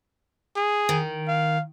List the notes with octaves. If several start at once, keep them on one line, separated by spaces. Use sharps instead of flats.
G#4
D#3
F5